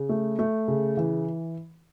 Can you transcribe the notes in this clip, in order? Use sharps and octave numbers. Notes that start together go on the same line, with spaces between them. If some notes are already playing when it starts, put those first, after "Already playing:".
Already playing: C#3
A3
A3
C#3
E3